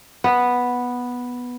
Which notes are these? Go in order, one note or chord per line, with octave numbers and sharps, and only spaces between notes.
B3